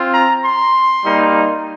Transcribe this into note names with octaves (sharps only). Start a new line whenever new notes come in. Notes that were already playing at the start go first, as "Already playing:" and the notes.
Already playing: C4 F4
A#5
C6
G3 A#3 D#4